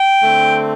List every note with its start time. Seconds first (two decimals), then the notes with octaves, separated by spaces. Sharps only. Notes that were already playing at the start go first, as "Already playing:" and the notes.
Already playing: G5
0.22 D3 A3 C4